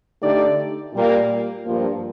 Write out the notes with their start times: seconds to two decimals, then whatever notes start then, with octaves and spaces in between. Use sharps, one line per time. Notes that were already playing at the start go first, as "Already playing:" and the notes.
0.21 D3 A3 D#4 G4 D5
0.93 A#2 G3 A#3
1.65 G2 F3 A#3